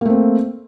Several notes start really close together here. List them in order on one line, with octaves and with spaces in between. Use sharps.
A#3 A3 C4